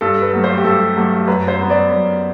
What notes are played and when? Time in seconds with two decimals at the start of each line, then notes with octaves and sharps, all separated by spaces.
0.01 G2 A4
0.22 B4
0.33 F#3 A3
0.44 C5
0.58 G4
0.64 G2 A4
0.96 F#3 A3
1.28 F#2 B4
1.48 C5
1.59 F#3 B3
1.70 D5
1.91 F#2